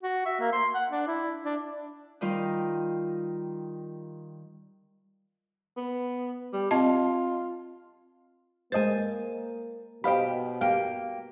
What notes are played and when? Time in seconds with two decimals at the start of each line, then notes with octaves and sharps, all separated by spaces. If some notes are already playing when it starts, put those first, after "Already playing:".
0.03 F#4
0.26 E5
0.40 A#3
0.53 C6
0.75 F#5
0.91 D4
1.07 E4
1.45 D4
2.21 D#3 G3 D#4 F4
5.77 B3
6.53 G3
6.71 C4 F4 D#5 A5
8.72 G#3 A#3 C5 D#5 G#5 A6
10.04 B2 G4 C5 D#5 F5 G5 B5
10.61 A#3 G4 F5 G5